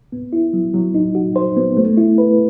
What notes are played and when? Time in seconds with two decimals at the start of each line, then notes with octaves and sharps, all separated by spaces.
0.12 B3
0.33 E4
0.53 F#3
0.74 F#3
0.95 D#4
1.15 F#4
1.36 C5
1.57 B3
1.77 A3
1.97 E4
2.18 B4